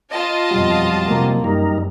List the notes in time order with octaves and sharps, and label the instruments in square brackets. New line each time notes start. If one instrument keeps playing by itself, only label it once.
[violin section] F4 D#5 A5
[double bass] F2 B2 [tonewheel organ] F#3 G3
[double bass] C3 A#3
[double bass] F#2 [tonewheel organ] G3 D#4 A#4